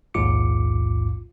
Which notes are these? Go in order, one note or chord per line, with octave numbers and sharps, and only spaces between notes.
A#1 D#2 G#2 F4 D6 C#7